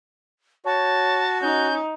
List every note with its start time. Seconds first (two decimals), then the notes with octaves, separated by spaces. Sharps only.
0.66 F#4 C#5 A5
1.42 C#4 D#4 G6